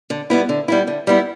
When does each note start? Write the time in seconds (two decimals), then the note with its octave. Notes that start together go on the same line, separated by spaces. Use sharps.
0.10 D3
0.30 G3 B3 E4
0.49 D3
0.68 G3 B3 E4
0.87 D3
1.07 G3 B3 E4